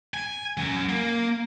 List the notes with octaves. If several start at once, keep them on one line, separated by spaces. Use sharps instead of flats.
G#5
F#3 C#4
A#3